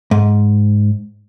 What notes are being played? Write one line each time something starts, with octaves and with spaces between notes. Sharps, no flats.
G#2